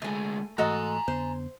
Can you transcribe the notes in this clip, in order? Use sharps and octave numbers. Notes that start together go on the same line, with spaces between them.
D2 G#3 A3 G#5
G#2 E3 A3 F#4 A4 D#5 G#5 A#5
F2 D3 B3 C5